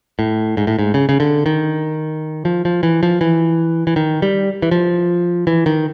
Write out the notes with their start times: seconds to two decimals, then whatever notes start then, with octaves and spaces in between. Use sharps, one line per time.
0.19 A2
0.57 G#2
0.67 A2
0.79 G#2
0.94 C#3
1.09 C#3
1.20 D3
1.46 D#3
2.45 F3
2.65 F3
2.83 E3
3.03 F3
3.21 E3
3.87 E3
3.96 D#3
4.22 G3
4.62 E3
4.71 F3
5.47 E3
5.66 D#3